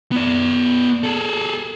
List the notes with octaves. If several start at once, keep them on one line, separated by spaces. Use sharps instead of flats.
B3 D5
G#4 A4